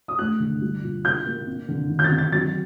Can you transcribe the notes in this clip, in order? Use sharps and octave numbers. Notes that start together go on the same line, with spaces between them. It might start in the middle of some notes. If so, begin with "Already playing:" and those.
D#6
A3 F#6
D3
G3
A#2
A#2 G6
A#3
C4
D3
D#3
G6
A6
C4
A6
F#3 A6